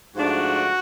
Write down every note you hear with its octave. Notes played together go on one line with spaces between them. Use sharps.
G#2 F3 A3 D4 F#4